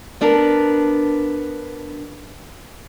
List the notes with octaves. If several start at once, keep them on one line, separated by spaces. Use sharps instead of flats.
B3 D4 A#4 A5